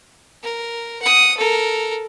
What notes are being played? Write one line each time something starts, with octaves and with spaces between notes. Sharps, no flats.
A#4
F#5 D#6
A4 A#4